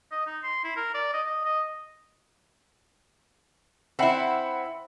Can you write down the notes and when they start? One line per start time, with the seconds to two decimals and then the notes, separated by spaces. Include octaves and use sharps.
0.12 D#5
0.27 D#4
0.43 C6
0.64 E4
0.76 A#4
0.95 D5
1.14 D#5
1.27 D#5
1.45 D#5
3.99 C4 E4 E5 F#5 B5